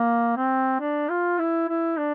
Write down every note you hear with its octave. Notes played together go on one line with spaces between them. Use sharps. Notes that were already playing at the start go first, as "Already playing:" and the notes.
Already playing: A#3
C4
D4
F4
E4
E4
D4